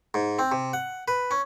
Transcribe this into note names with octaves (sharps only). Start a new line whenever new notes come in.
G#2
C4
C3
F#5
B4
C#4